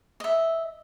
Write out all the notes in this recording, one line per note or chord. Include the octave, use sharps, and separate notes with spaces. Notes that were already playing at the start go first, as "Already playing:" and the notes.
D#5 E5